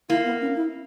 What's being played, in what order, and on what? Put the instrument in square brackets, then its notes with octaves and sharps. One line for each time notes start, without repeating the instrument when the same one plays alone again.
[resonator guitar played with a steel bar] A#3 [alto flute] E4
[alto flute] B3
C#4
E4